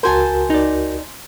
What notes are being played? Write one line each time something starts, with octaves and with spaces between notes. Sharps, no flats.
C#2 F#4 A#4 C5 G#5 A5
D#4 D5